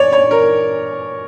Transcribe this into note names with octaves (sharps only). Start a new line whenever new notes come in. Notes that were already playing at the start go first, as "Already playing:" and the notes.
Already playing: C#5 D5
C#5
A#4